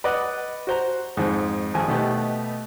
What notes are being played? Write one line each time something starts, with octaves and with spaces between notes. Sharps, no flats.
B4 D5 D#5 F#5
F#4 C5 A#5
F2 G#2
G#1 F2 G#5
B2 A3 D#4 G4 B4